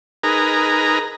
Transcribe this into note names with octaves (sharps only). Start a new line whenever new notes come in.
D#4 G#4 A#4 B4 A#5